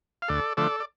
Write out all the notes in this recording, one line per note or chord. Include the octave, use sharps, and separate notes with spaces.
F5
D2 A4 D5
D3 F3 A3 A4 D5
D5